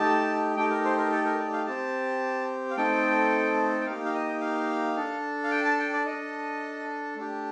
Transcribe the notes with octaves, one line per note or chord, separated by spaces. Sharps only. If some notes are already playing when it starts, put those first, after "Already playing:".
Already playing: A3 D#4 G4 A5
A3 D#4 G4 G5
A#4
C5
A#4
A4
A#4
D5
F5
C4 G4 A5
F5
A3 C4 D#4 A4 G5
G5
A#3 D#4 G4 F5
F5
D#5
F5
D4 A4
F5
G5
A5
G5
D5
D4 A4 D#5
A3 D4 G4